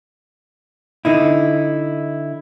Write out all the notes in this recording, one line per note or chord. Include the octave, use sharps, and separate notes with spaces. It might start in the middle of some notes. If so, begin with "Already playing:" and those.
D3 D#4 E4